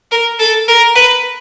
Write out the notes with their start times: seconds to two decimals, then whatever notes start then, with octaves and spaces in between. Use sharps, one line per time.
0.11 A#4
0.39 A4
0.68 A#4
0.95 B4